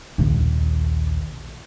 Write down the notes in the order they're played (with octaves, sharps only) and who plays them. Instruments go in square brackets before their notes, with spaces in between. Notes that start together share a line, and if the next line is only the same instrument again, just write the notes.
[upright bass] A#1 D#2